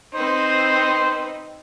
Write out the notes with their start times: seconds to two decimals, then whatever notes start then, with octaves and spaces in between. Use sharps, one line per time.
0.14 C4 D#4 B4 C5